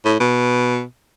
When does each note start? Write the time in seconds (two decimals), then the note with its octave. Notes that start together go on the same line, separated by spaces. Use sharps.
0.05 A2
0.20 B2